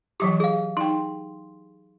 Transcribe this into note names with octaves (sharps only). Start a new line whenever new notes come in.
E3 F#3 G4 D6
G#4 F5
D#4 G5 C6